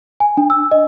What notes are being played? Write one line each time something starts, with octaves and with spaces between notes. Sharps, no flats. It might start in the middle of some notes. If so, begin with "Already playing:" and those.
G#5
D4
E6
D#5